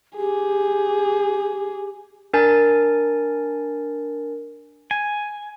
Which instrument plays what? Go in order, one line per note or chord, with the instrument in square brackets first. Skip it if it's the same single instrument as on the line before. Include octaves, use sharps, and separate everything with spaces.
[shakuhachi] G4 [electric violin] G#4
[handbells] D4 A#4 G#5 A6
[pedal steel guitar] G#5